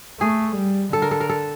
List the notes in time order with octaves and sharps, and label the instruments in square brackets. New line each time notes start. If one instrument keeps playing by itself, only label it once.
[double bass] A3 [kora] G#4
[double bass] G3
[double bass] D3 [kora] A4
[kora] A#4
A4
A#4
A4